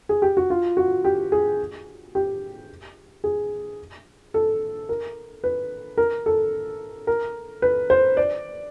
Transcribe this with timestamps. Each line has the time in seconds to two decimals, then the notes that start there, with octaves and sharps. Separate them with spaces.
0.09 G#4
0.22 G4
0.37 F#4
0.50 F4
0.77 F#4
1.05 G4
1.32 G#4
2.15 G4
3.24 G#4
4.34 A4
4.89 A#4
5.44 B4
5.98 A#4
6.26 A4
7.07 A#4
7.62 B4
7.90 C5
8.17 D5